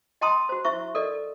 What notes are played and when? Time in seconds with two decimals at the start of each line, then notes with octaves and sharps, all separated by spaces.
0.21 D#5 G5 A5 A#5 C6 D#6
0.49 F#4 C5
0.65 E4 C5 E5 C#6
0.95 A4 A#4 D5 D#5